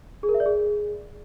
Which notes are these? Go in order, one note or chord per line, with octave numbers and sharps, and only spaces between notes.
G#4
A#4
E5
D5
G#4